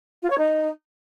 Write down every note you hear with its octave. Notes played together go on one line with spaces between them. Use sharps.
F4
C#5
D#4